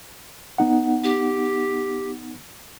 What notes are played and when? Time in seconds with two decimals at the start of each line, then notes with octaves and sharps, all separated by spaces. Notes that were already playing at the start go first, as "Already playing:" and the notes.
0.58 B3 D#4 F#5
1.04 G4